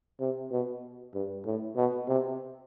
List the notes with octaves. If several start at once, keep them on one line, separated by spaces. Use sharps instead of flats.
C3
B2
G2
A2
B2
C3